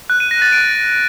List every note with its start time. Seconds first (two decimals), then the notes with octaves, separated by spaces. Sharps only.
0.10 F#6
0.20 D#7
0.31 A#6
0.42 A6
0.52 D7